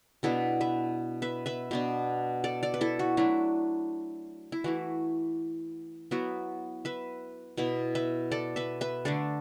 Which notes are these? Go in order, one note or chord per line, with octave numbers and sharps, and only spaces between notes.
B2 B3 D4 E4 A4
B4 E5
B4 E5
B4 E5
B2 B3 D4
A4 D5
A4 D5
B4
E4 A4
F#4
F#3 A3 D4 E4
E4
E3 A3 E4 F#4
F#3 B3 E4 F#4
B4 E5
B2 B3 E4
B4 E5
A4 D5
B4 E5
B4 E5
D3 A3 D4 A4 D5